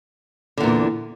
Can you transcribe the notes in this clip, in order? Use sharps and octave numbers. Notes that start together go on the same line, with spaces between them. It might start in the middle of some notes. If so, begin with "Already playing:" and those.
E2 A#2 D3